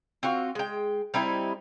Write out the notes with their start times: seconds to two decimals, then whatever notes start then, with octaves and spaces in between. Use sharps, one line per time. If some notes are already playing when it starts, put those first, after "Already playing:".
0.23 C4 F4 F#4
0.55 G#3 G5
1.14 G3 C4 D#4 E4